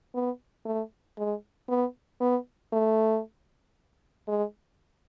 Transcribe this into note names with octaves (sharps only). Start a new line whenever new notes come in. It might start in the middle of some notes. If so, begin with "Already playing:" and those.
B3
A3
G#3
B3
B3
A3
G#3